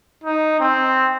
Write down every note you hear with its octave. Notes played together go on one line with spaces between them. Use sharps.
D#4
C4